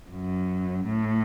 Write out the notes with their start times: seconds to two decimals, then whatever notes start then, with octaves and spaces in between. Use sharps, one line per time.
0.11 F#2
0.86 A2